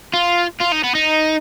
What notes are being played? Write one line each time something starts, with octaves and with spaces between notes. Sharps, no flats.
F4
F4
D#4
B3
D#4